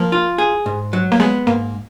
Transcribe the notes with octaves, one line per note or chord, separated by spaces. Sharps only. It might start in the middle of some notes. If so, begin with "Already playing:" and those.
Already playing: F3 A#3
F4
G#4
G#2
F#3
A#3
G#3 B3
G#2 A#3